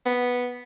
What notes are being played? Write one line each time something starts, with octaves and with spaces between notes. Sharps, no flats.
B3